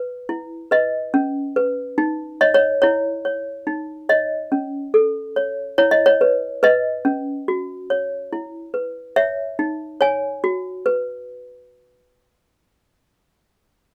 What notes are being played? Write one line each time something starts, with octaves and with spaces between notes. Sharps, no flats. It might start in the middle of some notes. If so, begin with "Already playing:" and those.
Already playing: B4
E4
B4 D#5
C#4
B4
D#4
C#5 D#5
C#5
E4 C#5
C#5
D#4
C#5 D#5
C#4
A4
C#5
E4 C#5
D#5
C#5
B4
B4 D#5
C#4
F#4
C#5
E4
B4
C#5 E5
D#4
C#5 G#5
F#4
B4